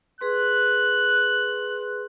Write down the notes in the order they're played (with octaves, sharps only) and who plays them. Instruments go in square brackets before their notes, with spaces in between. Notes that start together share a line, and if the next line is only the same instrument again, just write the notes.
[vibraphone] G#4 B4 C6 [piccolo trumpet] F#6